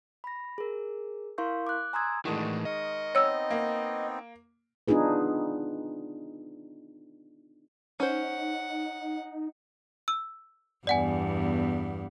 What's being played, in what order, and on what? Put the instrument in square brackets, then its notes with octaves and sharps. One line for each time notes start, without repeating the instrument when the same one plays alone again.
[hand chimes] B5 A#6
G#4 A#4
E4 A#4 F5 C6 C#6 G6
D6 F#6
G#5 A#5 C6 D#6 E6 G#6
[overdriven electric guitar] A2 E3 [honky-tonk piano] D#3 G#3 [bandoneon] D4 F#4
[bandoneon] A#4 C#6 [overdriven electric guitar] D#5
[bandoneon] B3 C4 D#4 [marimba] C#5 E6
[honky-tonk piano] A#3
[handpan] B3 D4 D#4 F4 G#4 B4
[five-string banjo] C#4 C5 [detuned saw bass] D#4 [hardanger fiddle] F#5
[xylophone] E6
[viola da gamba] E2 G2 B3 [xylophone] D5 F#5 G#5